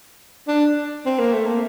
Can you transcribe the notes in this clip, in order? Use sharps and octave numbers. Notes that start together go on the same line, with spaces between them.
D4
C4
A#3
A3
A#3